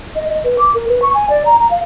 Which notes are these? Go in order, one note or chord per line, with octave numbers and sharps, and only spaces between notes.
D#5
D#5
B4
D6
A#4
B4
C#6
G#5
D5
A#5
A#5
F5